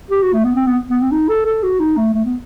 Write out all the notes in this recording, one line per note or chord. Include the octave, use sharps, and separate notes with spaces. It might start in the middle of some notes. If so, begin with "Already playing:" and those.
G4
F#4
A3
B3
C4
B3
B3
C4
D#4
A4
A4
F#4
D#4
A3
A3
B3